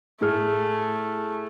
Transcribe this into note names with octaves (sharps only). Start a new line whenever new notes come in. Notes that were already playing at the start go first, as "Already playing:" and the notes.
A2 A3 G#4 F6